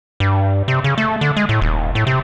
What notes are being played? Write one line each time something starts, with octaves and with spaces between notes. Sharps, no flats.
G2
C3
C#3
A3
D3
G#3
A2
D#1
A2
C3